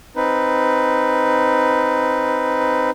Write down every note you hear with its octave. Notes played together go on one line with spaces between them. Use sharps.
C4 D#4 B4